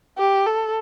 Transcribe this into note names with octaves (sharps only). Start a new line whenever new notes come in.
G4
A4